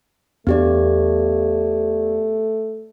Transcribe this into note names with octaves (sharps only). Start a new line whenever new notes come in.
E2 A3 B3 D4 G4 D5